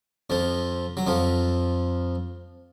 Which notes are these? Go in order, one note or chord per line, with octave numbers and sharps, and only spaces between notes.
F2 F3
F#3
F2 F3